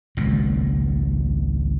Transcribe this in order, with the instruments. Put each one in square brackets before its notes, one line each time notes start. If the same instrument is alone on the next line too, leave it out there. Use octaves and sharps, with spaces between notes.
[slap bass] G#1 C#2 A#2 F#3